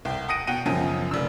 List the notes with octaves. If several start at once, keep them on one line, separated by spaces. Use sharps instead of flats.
C2 G5
F#5 D#6 A#6 D7 D#7
B2 F#5 G5 D#7
F#2 C#3 F3
F1 D4 E6